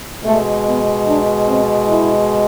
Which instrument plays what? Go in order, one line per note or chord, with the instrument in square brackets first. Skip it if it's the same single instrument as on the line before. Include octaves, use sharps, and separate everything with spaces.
[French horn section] B2 G#3 A3
B3
D4
C4
E4